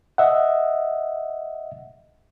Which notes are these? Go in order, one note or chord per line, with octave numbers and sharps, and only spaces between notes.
D#5 E5 F#5